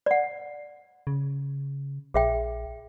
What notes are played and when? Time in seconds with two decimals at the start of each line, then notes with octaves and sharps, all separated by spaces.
0.06 D5 F#5
1.07 C#3
2.14 A#1 G#4 E5 G5